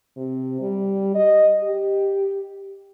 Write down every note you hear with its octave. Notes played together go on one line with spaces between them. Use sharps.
C3
G3
D#5
G4